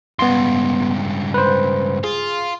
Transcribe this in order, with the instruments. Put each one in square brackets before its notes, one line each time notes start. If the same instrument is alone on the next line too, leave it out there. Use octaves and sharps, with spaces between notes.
[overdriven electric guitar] C#2 G2 [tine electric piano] B3 C6
[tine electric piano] B4 C5
[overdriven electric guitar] F4 [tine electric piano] G#4